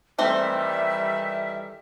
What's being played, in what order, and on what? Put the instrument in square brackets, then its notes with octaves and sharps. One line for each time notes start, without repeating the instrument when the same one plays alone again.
[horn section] D#3 E3 G3 [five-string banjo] A3 C4 C5 [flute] E5